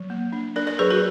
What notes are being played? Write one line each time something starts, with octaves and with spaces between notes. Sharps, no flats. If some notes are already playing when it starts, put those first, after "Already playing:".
Already playing: F#3
A#3
D4
D4 A#4 D5
A#4 D5
F#3 G#4 B4
F#4 A#4